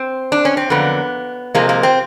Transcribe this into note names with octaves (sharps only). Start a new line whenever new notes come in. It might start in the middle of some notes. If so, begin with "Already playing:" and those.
Already playing: C4
D4
C#4
C4
F2 D3 F#3 A#3 B3
C3 F3 G#3 A#3
A#3
C4